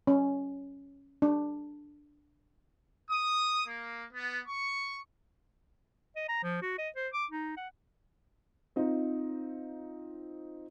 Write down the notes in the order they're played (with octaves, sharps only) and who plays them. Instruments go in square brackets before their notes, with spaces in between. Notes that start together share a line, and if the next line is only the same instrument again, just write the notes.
[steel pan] C#4
D4
[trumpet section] D#6
A#3
B3
C#6
[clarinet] D#5
A#5
F3
F#4
D#5
C5
D6
D#4
F#5
[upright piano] C4 D#4 F4